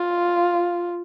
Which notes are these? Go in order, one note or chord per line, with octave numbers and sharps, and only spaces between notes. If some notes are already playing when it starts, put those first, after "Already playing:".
Already playing: F4